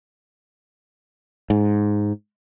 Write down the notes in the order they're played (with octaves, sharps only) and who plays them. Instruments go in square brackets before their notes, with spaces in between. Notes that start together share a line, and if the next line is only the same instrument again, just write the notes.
[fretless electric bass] G#2